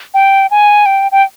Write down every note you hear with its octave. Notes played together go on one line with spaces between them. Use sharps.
G5
G#5
G5
G5